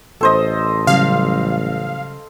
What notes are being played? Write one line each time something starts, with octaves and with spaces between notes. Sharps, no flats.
A1 A4 C5 D#5
C#3 F#3 G3 F5